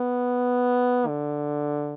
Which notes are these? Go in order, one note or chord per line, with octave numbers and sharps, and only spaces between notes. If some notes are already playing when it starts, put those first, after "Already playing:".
Already playing: B3
D3